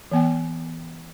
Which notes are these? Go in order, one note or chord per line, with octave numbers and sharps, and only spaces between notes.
E3 B3 G5